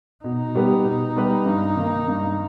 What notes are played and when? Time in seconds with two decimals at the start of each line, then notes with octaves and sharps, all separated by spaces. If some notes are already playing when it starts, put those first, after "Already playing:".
0.24 B2 D#4
0.55 G3 B3 G4 B4
0.85 B2
1.16 G3 B3 G4 B4
1.46 G2
1.76 D#3 A#3
2.08 G2